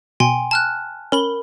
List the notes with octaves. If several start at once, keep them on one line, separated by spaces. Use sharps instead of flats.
B2 G5 G#5 C6
A5 F6 F#6
C#4 A#4 B5 G7